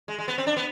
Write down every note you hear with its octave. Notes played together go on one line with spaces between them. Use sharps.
G#3
G#3
B3
C4
D4
B3